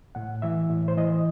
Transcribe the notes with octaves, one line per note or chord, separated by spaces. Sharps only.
A2 F#5
E3 E5
A2
C5
E3 D#5